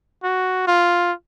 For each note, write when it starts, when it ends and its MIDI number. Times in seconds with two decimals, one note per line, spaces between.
0.23 0.66 66
0.67 1.12 65